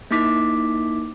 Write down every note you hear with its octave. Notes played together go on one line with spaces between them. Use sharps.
A#3 D#4 E4 D6 B6